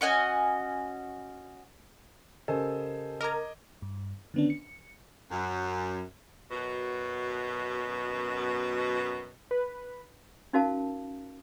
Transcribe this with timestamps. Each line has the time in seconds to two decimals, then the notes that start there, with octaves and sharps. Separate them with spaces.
0.01 C#4 F#4 D#5 G#5
2.48 C#3 G4 A4 A#4 C5 D#5 G#5
3.21 A#4 D#5 A#5 D6 G#6
3.82 G2
4.34 D3 D#3 B3 C#4 D4
4.50 C#7
5.31 F#2
6.51 F#2 B2
9.51 B4
10.53 C#4 D#4 F#4 A#4 F5 A5